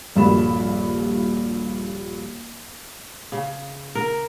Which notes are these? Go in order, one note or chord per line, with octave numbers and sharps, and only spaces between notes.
D#1 A#1 G2 F#4 B5 E7
C#3
A#4